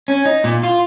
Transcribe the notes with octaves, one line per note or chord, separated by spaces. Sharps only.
C#4
D#4
A#2
F4